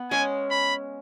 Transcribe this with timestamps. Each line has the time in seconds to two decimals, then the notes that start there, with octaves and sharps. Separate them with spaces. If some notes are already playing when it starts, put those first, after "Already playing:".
Already playing: B3
0.11 G#3 C#4 G#5
0.51 B5